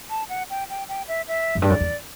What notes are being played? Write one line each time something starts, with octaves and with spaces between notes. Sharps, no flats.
A5
F#5
G5
G5
G5
E5
E5
F#2
G2
F#2 D5
E2